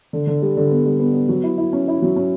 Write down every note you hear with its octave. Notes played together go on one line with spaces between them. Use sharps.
D3
D3
G3
D3
B3
G3
B3
B3
F#3
E4
E4
C#4
E4
F#3
C#4